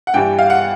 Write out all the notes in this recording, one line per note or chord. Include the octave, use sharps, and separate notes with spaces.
F#5
G2 E3 G3 G5
F5
F#5